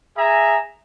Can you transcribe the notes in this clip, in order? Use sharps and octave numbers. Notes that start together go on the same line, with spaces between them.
G#4 E5 G#5 A#5